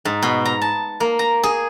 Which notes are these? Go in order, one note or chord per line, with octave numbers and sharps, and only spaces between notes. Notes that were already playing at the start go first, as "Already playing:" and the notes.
G#2
B2
A#5
A5
A#3
A#5
G#4